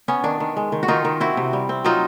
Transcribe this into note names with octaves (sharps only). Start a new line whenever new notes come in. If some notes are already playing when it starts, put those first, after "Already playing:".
B3 C#4
D#3 D4
D#3
G#3
D#3
F#4
D#3 D#4 F4
D#3
C4 E4 F#4
C3
G3
C4
F#3 D#4 F4